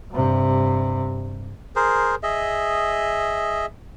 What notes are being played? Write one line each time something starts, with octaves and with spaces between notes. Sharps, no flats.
G2 C3
G#4 A#4 C5
G#4 D#5 E5